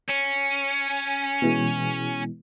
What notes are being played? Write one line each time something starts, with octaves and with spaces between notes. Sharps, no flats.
C#4
B2 E3 G#3